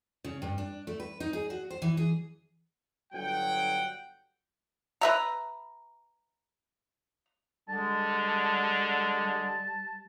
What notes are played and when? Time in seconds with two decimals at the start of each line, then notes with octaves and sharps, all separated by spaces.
0.24 C#3
0.42 G2
0.58 D4
0.87 A3
1.00 B4
1.20 D#4
1.33 G#4
1.50 F#4
1.70 C5
1.82 E3
1.97 G#4
3.13 G1 F#3 F#5 G5
5.01 B4 E5 A#5
7.69 D3 G3 G#3 A5